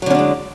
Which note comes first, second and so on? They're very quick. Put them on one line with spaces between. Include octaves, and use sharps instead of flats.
F#3 D3 C#4 D4 G#3